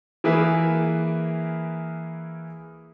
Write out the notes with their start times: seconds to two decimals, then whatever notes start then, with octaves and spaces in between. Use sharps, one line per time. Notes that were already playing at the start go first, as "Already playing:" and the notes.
0.24 E3 A#3 G#4 A#4 B4 E5